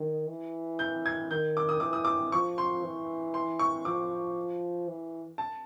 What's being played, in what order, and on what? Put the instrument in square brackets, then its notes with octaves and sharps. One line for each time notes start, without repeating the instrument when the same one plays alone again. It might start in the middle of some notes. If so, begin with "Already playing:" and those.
Already playing: [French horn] D#3
E3
[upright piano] G6
G#6
[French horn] D#3 [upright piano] G6
[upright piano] D6
D#6
[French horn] E3 [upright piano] D6
[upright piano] D#6
D6
[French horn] F3 [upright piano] C#6
[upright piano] C6
[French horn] E3
[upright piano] C6
C#6
[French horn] F3 [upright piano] D6
[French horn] E3
[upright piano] A5